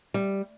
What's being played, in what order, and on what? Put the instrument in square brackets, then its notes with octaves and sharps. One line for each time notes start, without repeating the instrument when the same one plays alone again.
[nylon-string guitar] G3